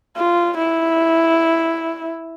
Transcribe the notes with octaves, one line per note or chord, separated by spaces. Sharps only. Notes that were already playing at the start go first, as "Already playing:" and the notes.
F4
E4